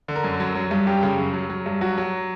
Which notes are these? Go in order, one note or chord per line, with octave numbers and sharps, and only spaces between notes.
D3
A#4
F#2
F#3
F#3
G2
F#2 G4
C#3
F#2
F#3
F#3
G2
F#3 F#4
F#3